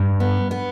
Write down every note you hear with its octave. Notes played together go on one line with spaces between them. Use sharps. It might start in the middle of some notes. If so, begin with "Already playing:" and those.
Already playing: G2
B3
B3